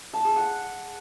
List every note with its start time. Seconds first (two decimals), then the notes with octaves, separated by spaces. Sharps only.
0.13 A5
0.25 G#4
0.36 F#5